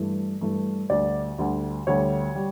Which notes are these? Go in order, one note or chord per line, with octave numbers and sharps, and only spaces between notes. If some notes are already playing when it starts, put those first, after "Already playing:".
Already playing: G2 E3 A3
G2 E3 A3
D2 D3 G3 D5
D2 D3 G3
D2 D3 G3 C#5
G3